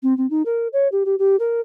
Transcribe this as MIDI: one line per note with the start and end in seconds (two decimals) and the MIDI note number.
0.03 0.16 60
0.17 0.29 60
0.30 0.42 63
0.45 0.68 70
0.73 0.88 73
0.92 1.03 67
1.05 1.15 67
1.19 1.36 67
1.39 1.60 70